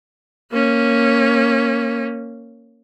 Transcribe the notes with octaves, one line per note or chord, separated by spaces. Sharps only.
A#3 C#4